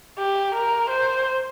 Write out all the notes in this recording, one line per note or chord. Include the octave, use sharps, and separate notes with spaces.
G4
A#4
C5